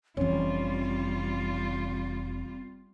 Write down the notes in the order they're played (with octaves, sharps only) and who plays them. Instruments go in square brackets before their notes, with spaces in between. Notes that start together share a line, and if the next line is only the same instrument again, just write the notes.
[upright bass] F1 E3 [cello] G3 F4 [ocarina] C4 [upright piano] C#4